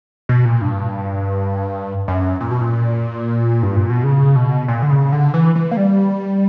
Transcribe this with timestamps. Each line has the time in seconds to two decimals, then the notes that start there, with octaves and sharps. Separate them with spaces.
0.29 B2
0.45 A#2
0.61 G2
2.08 F#2
2.41 A#2
2.51 B2
2.61 A#2
3.63 G2
3.76 A#2
3.90 B2
4.04 C#3
4.36 B2
4.68 A#2
4.82 D3
4.90 C#3
5.12 D3
5.34 E3
5.55 E3
5.71 A#3
5.77 G3